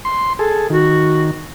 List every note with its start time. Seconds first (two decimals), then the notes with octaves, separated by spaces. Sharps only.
0.05 C6
0.39 G#4 A4
0.70 D#3 F#4